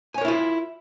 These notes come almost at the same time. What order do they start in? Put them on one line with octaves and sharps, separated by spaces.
G#5 C#5 A#4 E4 F4